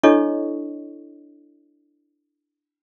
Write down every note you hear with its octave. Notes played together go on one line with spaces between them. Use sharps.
D4 E4 A4 C#5 D#5 C#6